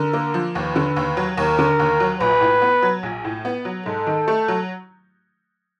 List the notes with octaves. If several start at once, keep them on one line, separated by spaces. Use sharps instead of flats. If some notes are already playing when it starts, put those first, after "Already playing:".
Already playing: D3 A#4
A#3
F3
D#2 B4
D3
D#2
F#3
D#2 A#4
D3
D#2
F#3
A#1 B4
A2
B3
F#3
A#1
A2
B3
F#3
G#2 A4
D#3
A3
F#3